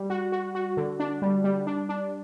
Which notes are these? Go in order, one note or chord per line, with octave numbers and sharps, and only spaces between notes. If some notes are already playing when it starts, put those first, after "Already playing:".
Already playing: G3
F#4
F#4
F#4
D3
D4
G3
G3
D4
D4